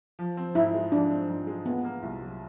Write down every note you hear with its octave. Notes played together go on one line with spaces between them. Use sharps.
F3
C4
G#2 E4
G#3
F3 D4
C4
G#2
G#3
A#2 B3
A#3
C2
F#3